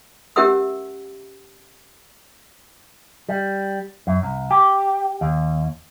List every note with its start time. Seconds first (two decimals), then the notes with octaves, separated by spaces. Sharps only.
0.36 C#4 G4 A#4 E5 F#5 E6
3.29 G3
4.07 F#2
4.23 C2
4.51 G4
5.21 D#2